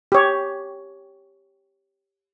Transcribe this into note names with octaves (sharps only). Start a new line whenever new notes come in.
G4 C#5